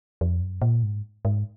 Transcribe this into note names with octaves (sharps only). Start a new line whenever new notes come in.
F2
F#2
A#2
G#2
G#2